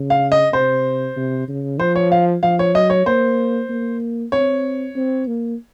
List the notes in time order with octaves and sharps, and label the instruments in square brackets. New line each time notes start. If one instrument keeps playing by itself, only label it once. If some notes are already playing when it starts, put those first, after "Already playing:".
Already playing: [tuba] C#3
[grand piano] F5
D#5
[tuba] C3 [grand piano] C5
[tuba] C3
C#3
[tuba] F3 [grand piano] C5
[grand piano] C#5
F5
[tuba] F3 [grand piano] F5
[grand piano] C#5
[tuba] F#3 [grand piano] D#5
[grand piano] C#5
[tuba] A#3 [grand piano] C5
[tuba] A#3
[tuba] C4 [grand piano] C#5
[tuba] C4
A#3